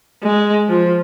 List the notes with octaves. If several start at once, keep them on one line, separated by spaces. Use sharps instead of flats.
G#3
F3